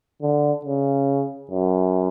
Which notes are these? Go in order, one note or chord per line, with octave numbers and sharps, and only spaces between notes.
D3
C#3
F#2